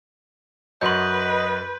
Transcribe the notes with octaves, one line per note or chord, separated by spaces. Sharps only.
F#2 F#4 B4 C#5 D#5 C6 G6